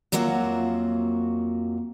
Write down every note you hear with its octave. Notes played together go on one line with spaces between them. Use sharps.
F2 F#3 A#3 F4 F#4 E5